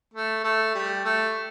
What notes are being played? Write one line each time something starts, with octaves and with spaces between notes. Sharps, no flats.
A3
A3
G3
A3